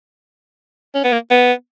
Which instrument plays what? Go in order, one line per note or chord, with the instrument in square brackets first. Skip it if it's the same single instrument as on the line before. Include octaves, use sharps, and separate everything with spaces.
[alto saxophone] C#4
B3
A#3
B3